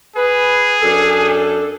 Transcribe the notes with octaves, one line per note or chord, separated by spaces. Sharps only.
G#4 B4
F#2 D4 A4